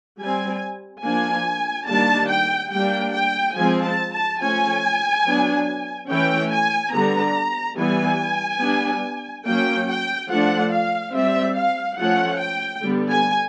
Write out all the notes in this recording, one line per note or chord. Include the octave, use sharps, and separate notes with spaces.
G3 C4 G#5
F3 A#3 D4 G#5
D#3 G3 A#3 D4 A5
G5
G3 A#3 D4 G5
G5
F3 G#3 C4 G#5
A5
A5
F3 A3 C#4 G#5
F#3 B3 D4
E3 A3 C#4 G5
G#5
D3 G3 B3 D4 A#5
E3 G3 B3 G#5
G3 B3 D4
F#3 A#3 C#4 G5
G5
F3 A3 D4 F#5
F5
G3 C4 E5
F5
F3 A3 C#4 F#5
G5
D3 G3 B3
G#5